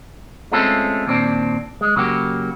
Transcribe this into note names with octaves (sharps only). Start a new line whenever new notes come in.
G#3 A3 C4 C#4 F4 A4
D#2 A#2 C4 D4
G#3
C#3 F#3 A#3 F#4 G4